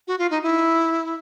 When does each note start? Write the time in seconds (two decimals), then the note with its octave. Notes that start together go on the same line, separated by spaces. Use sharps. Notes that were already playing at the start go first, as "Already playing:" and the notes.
0.08 F#4
0.19 F4
0.31 D#4
0.43 E4